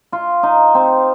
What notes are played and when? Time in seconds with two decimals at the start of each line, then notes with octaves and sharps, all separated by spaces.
0.12 F4
0.43 D#4
0.75 C4